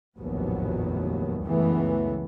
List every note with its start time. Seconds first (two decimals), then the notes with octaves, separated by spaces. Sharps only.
0.18 F1 A#1 D#2 A2 F#3 B3
1.42 C#2 F#2 E3 A3 B3